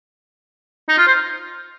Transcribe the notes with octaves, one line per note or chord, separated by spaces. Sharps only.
D#4
F4
C5